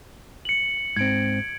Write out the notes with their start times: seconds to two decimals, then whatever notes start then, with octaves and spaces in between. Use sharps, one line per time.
0.45 C#7 F#7
0.96 G#2 C4 G#6 D7